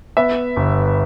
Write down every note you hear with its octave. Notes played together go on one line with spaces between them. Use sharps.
B3 E5
G1